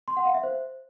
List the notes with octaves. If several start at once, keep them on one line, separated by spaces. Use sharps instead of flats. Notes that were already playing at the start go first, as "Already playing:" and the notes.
C6
F#5
F5
E5
C5